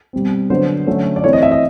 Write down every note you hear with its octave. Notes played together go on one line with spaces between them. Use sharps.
B2 G3 C4
D3 F#3 B3 D4 C5
D3 F#3 A3 C#4
D5
E3 A3 C4 C#5
D#5
E5
D#5